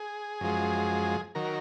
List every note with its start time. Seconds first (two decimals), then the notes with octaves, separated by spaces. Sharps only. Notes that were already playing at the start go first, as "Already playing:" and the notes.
Already playing: G#4
0.41 F#2 F3 G#3
1.35 D#3 F#3 A#4